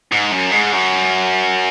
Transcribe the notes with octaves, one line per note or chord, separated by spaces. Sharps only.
G#2
F#2
G#2
F#2